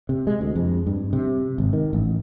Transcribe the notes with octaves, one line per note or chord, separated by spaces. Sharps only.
C3
G#3
D2
F2
G2
C3
G#1
D#3
A1